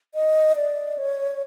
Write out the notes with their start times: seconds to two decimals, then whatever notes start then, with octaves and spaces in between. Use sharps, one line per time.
0.15 D#5
0.56 D5
0.98 C#5